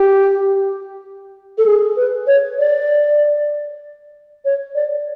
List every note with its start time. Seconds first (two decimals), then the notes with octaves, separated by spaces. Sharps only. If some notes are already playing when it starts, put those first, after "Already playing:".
Already playing: G4
1.58 A4
1.66 G#4
1.97 B4
2.27 C#5
2.59 D5
4.45 C#5
4.75 D5